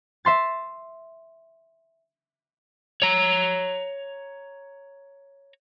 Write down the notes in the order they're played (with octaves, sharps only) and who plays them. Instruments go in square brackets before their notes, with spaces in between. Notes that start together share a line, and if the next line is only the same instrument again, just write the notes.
[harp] E5 C6 A6
[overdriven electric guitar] C#5 A#5